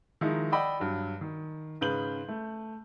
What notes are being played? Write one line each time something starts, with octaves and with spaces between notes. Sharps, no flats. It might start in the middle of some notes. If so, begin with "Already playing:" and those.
D#3 F3 G#3 D#4 E4
D5 D#5 F#5 G5 B5 E6
G2 F#3
D#3
G#2 C#3 B4 G6 F#7
A3